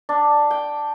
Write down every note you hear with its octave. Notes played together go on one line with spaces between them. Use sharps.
D4
G5